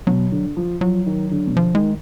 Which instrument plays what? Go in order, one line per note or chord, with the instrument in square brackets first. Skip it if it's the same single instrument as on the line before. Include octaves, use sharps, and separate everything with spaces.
[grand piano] B2 [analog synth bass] F#3
[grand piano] D3
F3
[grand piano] F3 [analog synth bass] F#3
[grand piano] D#3
D3
B2
[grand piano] D3 [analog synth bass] F3
[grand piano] D#3 [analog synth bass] G#3